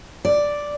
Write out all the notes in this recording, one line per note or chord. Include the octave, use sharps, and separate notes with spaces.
D5